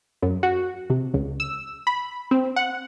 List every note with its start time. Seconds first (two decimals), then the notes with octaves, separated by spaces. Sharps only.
0.22 F#2
0.43 F#4
0.90 C3
1.14 C#2
1.40 E6
1.87 B5
2.31 C4
2.56 F#5